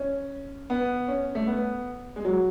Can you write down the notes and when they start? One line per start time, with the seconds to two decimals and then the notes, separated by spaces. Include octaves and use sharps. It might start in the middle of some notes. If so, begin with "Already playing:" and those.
Already playing: C#4
0.70 B3
1.08 C#4
1.35 A3
1.47 B3
2.16 G#3
2.25 F#3